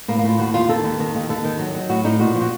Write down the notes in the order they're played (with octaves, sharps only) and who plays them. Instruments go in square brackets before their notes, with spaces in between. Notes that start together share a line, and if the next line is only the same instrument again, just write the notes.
[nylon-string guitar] A2 A#3
A#3
A2
F4
D#2 F#4
D#2 F4
D#3 A4
D#2
D#3
D#2
D#2 A4
D#3
F#3
F#3
A2 F#4
A2 D#4
A#2 F#4
F3
F#4